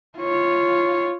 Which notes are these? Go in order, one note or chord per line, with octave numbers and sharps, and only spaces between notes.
F4 C#5